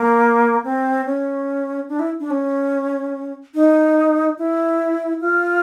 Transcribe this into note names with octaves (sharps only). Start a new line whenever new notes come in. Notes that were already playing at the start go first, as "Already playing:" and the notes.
Already playing: A#3
C4
C#4
D4
E4
D4
C#4
D#4
E4
F4